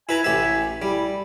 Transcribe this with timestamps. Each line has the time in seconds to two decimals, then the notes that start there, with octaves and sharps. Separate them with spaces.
0.09 E4 B4 G#5 A#5
0.24 A1 G4 E5
0.82 G3 E4